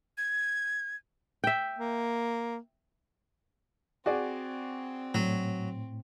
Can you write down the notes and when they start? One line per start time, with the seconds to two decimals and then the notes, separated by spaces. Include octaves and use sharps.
0.18 G#6
1.44 E5 G5
1.79 A#3
4.06 C4 F#4 G#4 D5
5.15 A2 F#3